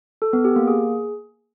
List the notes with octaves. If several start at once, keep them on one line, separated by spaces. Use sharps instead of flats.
A4
B3
G4
A#3
G#4